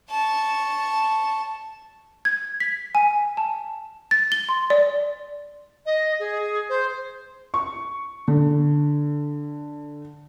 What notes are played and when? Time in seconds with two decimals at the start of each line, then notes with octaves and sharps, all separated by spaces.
0.10 A5 C#6
2.25 G#6
2.60 B6
2.95 G#5
3.37 A5
4.11 A6
4.32 G7
4.49 C6
4.70 D5
5.86 D#5
6.20 G#4
6.69 C5
7.54 C#6
8.28 D3